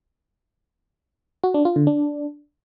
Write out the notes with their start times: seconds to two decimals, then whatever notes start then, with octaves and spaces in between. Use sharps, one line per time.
1.44 F#4
1.54 D4
1.65 F4
1.76 D3
1.87 D4